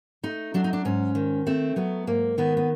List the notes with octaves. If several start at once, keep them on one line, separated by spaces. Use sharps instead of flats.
A3 D#4
F#3 D4
D#4
D4
G#2 C#4
D#3
A3 C4
F#3 B3
G#2 A#3
D#3 B3
B3